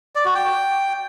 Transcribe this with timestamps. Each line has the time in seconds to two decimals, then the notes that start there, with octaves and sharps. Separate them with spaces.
0.16 D5
0.25 F#4
0.35 G5